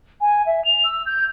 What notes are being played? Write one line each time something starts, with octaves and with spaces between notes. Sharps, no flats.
G#5
E5
F7
E6
G6